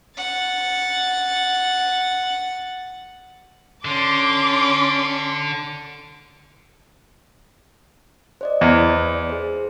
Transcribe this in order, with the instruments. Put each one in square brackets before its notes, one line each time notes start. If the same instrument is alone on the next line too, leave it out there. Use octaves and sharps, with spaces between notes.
[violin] F#5 A6
[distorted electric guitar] D3 [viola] C#4 C6 [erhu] D6
[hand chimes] C5 D5 D#5
[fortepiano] E2
[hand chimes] G#4 C5